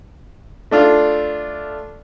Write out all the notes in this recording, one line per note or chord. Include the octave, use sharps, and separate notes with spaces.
A3 D4 F4